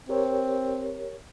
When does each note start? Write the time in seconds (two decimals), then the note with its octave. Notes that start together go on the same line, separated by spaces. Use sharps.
0.09 C4 G4 A#4 C#5